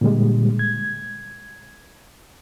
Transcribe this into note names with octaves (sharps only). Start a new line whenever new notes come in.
A#2 D3 G3 G#3
G#6